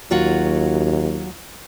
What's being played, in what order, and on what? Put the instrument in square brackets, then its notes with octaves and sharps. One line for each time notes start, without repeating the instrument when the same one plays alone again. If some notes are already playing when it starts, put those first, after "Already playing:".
[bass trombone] D#2 [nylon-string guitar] F#3 F4 F#4